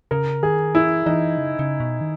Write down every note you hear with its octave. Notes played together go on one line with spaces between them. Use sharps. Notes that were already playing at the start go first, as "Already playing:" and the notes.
C#3 A#4
D#3 G#4
E3 E4
E3 D#4
C#3
C#3
B2
D#3